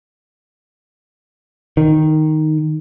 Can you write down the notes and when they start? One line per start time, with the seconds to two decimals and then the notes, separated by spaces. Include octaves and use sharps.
1.77 D#3